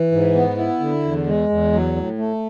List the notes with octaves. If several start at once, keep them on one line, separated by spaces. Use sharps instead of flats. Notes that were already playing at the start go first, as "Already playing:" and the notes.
Already playing: E3
G#2
B3
E4
D3
E2
G#3
E2
F#3
A2
A3